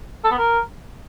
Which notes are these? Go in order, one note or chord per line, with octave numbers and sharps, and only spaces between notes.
A4
B3
A#4